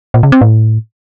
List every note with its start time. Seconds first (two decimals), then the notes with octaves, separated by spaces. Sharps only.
0.14 A#2
0.23 C#3
0.32 C4
0.41 A2